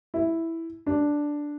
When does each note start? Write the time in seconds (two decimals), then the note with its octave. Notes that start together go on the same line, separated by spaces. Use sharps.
0.14 E4
0.87 D4